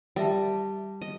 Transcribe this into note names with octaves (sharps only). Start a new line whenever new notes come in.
G3 A#4 E5 A5
D#5